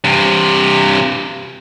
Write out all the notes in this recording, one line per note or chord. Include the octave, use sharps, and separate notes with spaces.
G2 C3